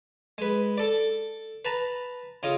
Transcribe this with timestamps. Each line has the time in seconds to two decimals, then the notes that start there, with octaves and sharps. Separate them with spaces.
0.38 G#3 B4
0.78 A4 D5
1.65 B4 A5 A#5
2.43 C#3 F4 D#5